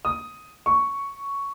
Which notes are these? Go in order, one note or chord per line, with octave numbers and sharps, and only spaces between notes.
D#6
C#6